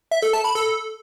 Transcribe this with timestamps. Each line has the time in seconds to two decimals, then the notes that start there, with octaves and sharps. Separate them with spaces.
0.11 E5
0.22 A4
0.33 A5
0.44 B5
0.55 A4